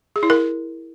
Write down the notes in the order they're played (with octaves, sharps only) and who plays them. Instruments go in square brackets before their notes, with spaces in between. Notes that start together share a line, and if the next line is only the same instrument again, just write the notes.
[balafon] G#4
E4
A#4